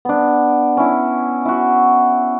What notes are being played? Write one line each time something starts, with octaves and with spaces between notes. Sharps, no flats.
B3 D4
C#4 E4
E4 F#4